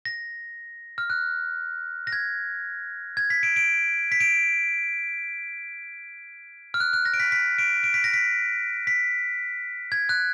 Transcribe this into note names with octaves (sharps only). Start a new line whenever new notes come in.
A#6
F6
F#6
A#6
G#6
G#6
B6
D7
D7
B6
D7
F6
F#6
F#6
A#6
D7
B6
B6
D7
D7
B6
A#6
B6
B6
G#6
F#6